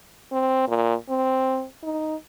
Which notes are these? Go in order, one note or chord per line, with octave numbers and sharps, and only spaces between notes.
C4
A#2
C4
D#4